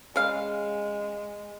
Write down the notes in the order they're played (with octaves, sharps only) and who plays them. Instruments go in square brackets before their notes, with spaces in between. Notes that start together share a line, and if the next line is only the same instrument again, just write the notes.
[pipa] C#3 F5 [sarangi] G#3